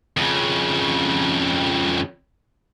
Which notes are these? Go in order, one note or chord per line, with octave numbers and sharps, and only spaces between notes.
F2 C#3